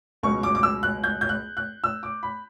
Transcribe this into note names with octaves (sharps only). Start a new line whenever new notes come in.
C#2 B2 F#3 C#6
D6
D6
E6
F#6
G6
G6
F#6
F#6
E6
D6
B5